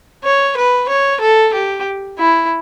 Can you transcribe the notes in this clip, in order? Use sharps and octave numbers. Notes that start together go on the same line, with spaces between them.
C#5
B4
C#5
A4
G4
E4